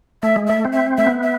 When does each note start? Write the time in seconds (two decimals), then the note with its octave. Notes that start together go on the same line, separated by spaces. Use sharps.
0.23 A3 E5
0.36 G#3
0.47 A3 E5
0.65 C4
0.73 E5
0.97 A3 E5
1.07 B3
1.23 E5